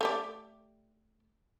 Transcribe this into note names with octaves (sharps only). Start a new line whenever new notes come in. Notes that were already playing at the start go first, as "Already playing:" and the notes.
A3 G4 D5